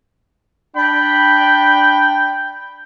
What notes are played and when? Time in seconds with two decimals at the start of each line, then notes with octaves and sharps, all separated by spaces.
0.76 D4 G5 B5